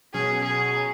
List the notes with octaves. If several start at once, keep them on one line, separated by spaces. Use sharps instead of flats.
B2 F#3 C#4 G#4
G#4